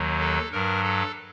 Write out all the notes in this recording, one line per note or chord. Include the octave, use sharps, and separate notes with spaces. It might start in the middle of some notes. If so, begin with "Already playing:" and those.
Already playing: D#2 D#3 F#3
A4
G2 F#3 A#4
A4